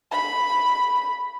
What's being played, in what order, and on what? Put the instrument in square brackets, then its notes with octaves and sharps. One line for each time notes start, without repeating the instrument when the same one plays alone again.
[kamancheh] B5